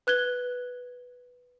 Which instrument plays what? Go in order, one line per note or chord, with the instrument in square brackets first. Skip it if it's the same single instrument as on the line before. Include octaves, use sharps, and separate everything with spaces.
[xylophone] B4 F#6 G#6 G7